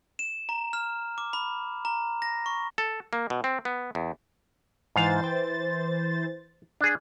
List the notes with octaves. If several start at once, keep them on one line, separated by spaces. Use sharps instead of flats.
E7
A#5
F6
D6
B5
A#5
A#6
C#6
A4
A#3
B2
C4
B3
E2
G#2 E3 C5 F5 A6
G5
D4 G#4